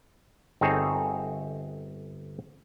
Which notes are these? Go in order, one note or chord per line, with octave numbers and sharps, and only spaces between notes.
G1 C4 D#4 G#4 A4 C#5